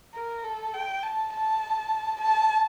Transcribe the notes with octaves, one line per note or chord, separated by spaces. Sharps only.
A#4
A4
G5
A5
A5
A5